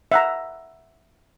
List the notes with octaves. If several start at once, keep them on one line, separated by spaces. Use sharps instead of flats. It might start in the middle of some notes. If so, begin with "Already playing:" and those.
E5 F#5 A#5